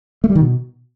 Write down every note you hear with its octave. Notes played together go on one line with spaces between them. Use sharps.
A3
G3
D#3
B2